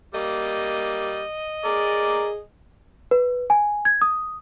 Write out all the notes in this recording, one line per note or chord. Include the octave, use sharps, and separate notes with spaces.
G3 A#3 D#5
G#4 A#4 D5
B4
G#5
G#6
D#6